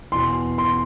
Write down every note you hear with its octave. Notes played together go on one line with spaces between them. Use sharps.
E2 B2 C6
C6